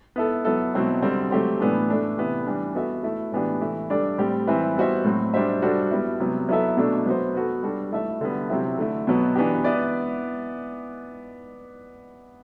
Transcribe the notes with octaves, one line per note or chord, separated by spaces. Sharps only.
B3 E4 A4
F#3 B3 E4 A4
B2 F#3 C4 E4
D3 G3 C4
F#3 A3 C4 G4 C5
A2 E3 B3 D4 A4
A3 D4 A4
C3 E3 B3 E4
E3 G3 D4
B3 F#4 A4 E5
A3 E4 A4
A2 E3 B3 D4 G4
E3 A3 E4
G3 D4 A4 D5
A2 G3 C4 G4 D5
E3 G3 C4 E4 B4
G3 B3 F#4 C5 E5
A2 F#3 C4
G3 D4 F#4 C5 E5
G3 D4 F#4 A4 C5
G3 B3 E4
C3 F#3 B3
F#3 B3 E4 A4 E5
B2 A3 D4 A4
F#3 B3 F#4 C5
B3 F#4 A4
G3 D4 F#4 A4
A3 E4 A4 E5
D3 G3 B3
C3 F#3 C4 E4
D3 A3 E4
B2 F#3 B3
E3 B3 D4 G4
B3 E4 B4 D5